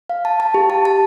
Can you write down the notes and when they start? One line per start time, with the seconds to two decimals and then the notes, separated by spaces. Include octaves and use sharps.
0.10 F5
0.25 A5
0.40 A5
0.54 G4
0.70 A5
0.85 A5